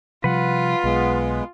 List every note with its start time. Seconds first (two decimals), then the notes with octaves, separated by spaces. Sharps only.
0.24 C3 F3 G3 F4 B4 F#5
0.84 B1 G#3 B3